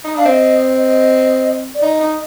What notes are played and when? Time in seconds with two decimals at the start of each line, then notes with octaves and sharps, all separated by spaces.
0.04 D#4
0.15 D4 F5
0.25 C4 D#5
0.78 D#5
1.75 D5
1.82 D#4 D#5
2.00 D#4